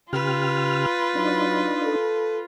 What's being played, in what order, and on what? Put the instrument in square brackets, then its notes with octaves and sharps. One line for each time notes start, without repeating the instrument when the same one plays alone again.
[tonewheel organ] C#3 G4 F6 [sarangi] F4 [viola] B4
[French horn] F#3 [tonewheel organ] D4 D#4
[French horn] A4